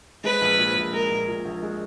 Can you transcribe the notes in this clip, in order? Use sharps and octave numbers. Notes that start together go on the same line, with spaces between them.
G#3 B4
A#1
A#2
A#1
G#3 A#4
A#1
A#2
A#1
G#3